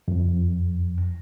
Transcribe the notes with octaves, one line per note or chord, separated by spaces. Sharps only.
F2